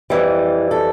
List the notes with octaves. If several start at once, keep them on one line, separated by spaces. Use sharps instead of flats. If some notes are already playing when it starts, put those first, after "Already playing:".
F2 E3 G3
A4